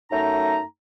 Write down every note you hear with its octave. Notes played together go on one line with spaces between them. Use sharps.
F#2 A3 D#4 A#5